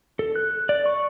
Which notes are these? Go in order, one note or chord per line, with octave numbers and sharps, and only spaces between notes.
A4
F#6
D5
C#6